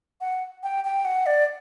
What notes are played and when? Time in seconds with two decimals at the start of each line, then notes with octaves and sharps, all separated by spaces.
0.21 F#5
0.63 G5
0.85 G5
1.05 F#5
1.26 D5